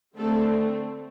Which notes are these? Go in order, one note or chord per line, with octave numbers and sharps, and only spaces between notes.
D3 A3 C4 A4